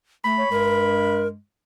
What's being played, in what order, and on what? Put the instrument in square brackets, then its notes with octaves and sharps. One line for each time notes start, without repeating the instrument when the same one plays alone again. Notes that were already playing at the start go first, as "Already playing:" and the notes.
[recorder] A3 [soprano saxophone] B5
[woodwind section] C#5
[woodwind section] G2 G#3 [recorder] A#4